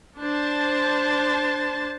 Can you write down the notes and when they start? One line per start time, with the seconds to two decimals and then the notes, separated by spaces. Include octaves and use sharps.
0.19 D4 C5 A5